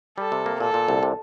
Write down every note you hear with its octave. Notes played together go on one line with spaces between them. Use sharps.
G3 A4
C3
A#3
A#2 A4
A#2
C2
C3